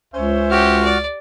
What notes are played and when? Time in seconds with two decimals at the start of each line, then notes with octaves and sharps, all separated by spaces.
0.14 C#2 C#4 C5 E5
0.51 F#4 G4 F6
0.85 D5